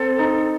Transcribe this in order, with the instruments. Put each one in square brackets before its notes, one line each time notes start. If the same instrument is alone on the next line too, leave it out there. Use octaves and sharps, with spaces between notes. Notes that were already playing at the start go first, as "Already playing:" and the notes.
Already playing: [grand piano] C4 [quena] A4
[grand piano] D#4